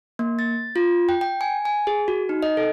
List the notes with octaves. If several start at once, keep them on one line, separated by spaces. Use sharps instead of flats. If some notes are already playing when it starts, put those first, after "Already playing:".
A#3
A6
F4
G5
G5
G#5
G#5
G#4
F#4
D#4
D#5
A4